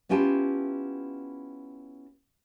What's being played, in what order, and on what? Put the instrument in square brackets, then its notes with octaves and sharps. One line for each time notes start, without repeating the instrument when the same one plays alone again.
[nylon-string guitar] B3 C#4 E4 F4 G4 A5